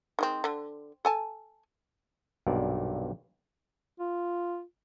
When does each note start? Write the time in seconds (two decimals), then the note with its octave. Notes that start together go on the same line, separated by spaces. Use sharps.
0.19 D#3 G#3 C4
0.44 D3
1.05 A4 G#5 A5
2.47 B1 G2 A#2 D5
4.00 F4